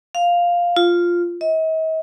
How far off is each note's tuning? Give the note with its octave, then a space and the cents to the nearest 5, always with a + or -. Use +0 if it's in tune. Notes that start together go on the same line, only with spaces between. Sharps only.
F5 +0
F4 +0
D#5 +45